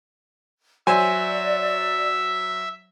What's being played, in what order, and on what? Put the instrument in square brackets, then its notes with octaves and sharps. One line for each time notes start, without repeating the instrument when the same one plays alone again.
[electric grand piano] F#3 C5 [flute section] D5 [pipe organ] E5 [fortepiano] G#5